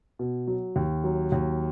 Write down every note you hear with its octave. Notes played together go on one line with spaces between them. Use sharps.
B2
F#3
D#2
F#3
D#2